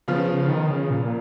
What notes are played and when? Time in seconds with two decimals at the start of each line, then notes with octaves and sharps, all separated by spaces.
0.08 C#3 F3 B3 F4
0.48 D#3
0.68 C#3
0.90 A#2